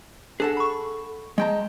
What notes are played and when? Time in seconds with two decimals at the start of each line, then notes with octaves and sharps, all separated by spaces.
0.40 D4 G#4 A4 F#5
0.57 B5 C#6
1.38 G#3 D#5 G5 A5 A#5